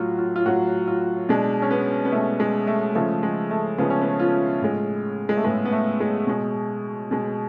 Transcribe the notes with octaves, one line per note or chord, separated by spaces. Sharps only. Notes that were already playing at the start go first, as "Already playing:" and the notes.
Already playing: A2 F#3 F4 F#4
F4
F4
A2 F#3 F#4
F4
B2 G#3 D4
C#4
B3
B3
B2 G#3 A3
G#3
A3
C#3 F3 G#3 A3
G#3
A3
C#3 F3 G#3 B3
C#4
B3
F4
A2 G#3
G#3
A3
A2 G#3 B3
B3
A3
G#3
B2 G#3
B2 G#3